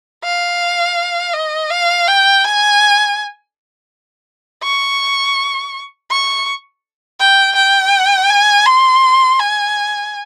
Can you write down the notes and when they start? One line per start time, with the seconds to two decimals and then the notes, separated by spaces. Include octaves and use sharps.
0.24 F5
1.33 D#5
1.70 F5
2.07 G5
2.44 G#5
4.63 C#6
6.10 C#6
7.20 G5
7.56 G5
8.30 G#5
8.66 C6
9.39 G#5